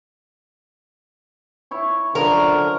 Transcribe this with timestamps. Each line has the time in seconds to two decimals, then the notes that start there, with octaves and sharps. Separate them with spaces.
1.71 E4 C#5 C#6
2.15 F#2 D3 F3 A#4 C#6